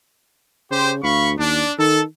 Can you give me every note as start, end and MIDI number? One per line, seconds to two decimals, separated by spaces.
0.71 1.01 49
0.71 0.90 67
0.71 0.90 72
1.03 1.38 38
1.03 1.31 77
1.03 1.31 83
1.03 1.31 85
1.39 1.63 39
1.39 1.72 62
1.79 2.03 51
1.79 2.01 69